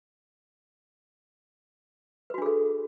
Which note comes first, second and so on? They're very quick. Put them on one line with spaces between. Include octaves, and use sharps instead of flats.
B4 F#4 D4 G#4 A4